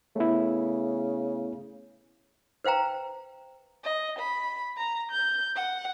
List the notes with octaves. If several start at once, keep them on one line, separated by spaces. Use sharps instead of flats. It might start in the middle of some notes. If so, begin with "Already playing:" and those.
C#3 A3 B3 E4
B4 C5 F5 G5 A#5
D#5
B5
A#5
G6
F#5